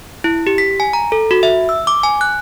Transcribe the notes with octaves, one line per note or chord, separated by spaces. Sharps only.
E4
G4
B6
G#5
A#5
A4
F#4
E5
E6
D6
G#5
F#6